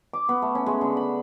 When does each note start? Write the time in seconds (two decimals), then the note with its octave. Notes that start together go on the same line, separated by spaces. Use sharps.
0.13 D6
0.29 B3
0.42 A3
0.55 C#4
0.66 G#3
0.81 D3
0.97 B5